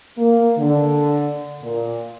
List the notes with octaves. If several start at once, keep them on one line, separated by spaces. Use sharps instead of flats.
A#3
D3
A#2